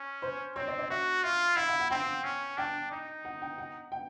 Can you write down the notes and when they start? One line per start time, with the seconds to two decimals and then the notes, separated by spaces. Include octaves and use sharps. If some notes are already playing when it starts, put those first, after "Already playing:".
Already playing: C#4
0.22 C5
0.55 C4 C#5
0.68 D5
0.79 D5
0.90 F#4 E5
1.23 F4 E5
1.56 E4 F5
1.68 F5
1.80 F#5
1.91 C4 G5
2.24 C#4
2.58 D4 G5
2.91 D#4
3.25 F#5
3.42 G5
3.58 F#5
3.92 G5